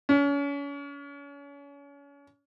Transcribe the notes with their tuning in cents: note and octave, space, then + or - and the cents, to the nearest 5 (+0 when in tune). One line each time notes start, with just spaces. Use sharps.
C#4 +35